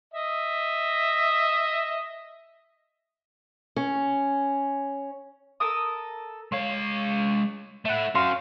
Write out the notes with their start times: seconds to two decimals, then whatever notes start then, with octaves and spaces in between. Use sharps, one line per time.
0.14 D#5 E5
3.76 C#4
5.60 A4 A#4 D#6
6.52 G#3 C#5 F5
7.85 A3 E4 E5 F#5
8.15 C#4 F#4 F5 C6